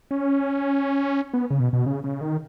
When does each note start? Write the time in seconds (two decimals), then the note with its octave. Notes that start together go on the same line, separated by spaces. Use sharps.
0.11 C#4
1.34 B3
1.50 C#3
1.60 B2
1.73 B2
1.86 C#3
2.04 C#3
2.21 D#3